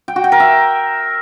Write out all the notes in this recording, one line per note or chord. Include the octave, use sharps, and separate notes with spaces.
G5
F#4
G5
A#4
E5